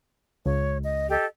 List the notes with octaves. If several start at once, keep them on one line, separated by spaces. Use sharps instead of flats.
C#2 C#5
D#5
G4 A4 D#5